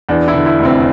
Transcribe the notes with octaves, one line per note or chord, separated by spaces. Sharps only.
E2 D4
E4
D3
E4
F1
C4